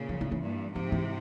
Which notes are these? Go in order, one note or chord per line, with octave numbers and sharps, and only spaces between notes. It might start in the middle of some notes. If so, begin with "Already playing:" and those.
Already playing: A#2 C#3
F3
E3
E3
G2 A#2
G#2 C3 F3
E3